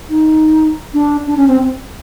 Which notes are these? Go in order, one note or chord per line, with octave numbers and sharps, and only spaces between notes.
D#4
D4
D4
C#4
C4